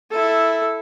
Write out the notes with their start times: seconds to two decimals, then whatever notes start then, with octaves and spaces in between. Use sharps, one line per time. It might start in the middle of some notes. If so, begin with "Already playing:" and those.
0.11 E4 A4